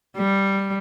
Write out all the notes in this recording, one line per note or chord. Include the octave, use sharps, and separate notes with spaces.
G3